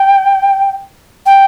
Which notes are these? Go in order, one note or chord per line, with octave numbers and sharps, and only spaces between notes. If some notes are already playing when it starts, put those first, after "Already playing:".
Already playing: G5
G5